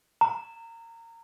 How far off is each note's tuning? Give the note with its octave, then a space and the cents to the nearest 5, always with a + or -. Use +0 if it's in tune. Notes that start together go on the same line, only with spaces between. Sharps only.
A#5 -25